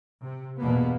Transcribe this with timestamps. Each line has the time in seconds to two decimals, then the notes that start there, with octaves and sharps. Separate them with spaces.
0.22 C3
0.60 E2 G2 B2 A#3 B3